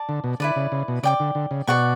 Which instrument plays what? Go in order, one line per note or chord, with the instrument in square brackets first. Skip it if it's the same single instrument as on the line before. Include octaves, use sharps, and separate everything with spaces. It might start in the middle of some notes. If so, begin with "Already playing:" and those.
Already playing: [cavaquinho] D5 A5 D6
[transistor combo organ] D3
B2
[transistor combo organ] D3 [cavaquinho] E4 B4 D5
[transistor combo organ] C#3
C#3
B2
[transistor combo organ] C#3 [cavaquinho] D5 G5 D6
[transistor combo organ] D3
D3
C#3
[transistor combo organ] B2 [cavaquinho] D5 F#5 C#6